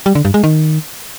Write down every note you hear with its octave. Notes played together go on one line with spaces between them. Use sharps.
G3
D3
G2
G#3
D#3